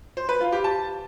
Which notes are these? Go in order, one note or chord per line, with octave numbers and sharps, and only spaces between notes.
C5
B4
F4
G4
A5